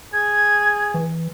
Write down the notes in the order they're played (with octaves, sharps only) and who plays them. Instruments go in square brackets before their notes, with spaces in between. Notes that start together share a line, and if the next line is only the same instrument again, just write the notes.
[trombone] G#4 [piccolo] G#6
[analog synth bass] E3